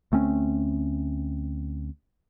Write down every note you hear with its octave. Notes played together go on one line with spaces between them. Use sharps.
D2 A3 C4 C#4